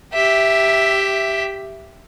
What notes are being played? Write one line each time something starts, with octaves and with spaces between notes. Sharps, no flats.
G4 E5